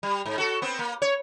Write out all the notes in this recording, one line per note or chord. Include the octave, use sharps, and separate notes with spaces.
G3
G#2
F#4 A4
B3 C4
A#3
C#5